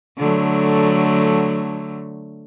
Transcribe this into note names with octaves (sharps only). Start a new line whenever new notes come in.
D3 F#3 A3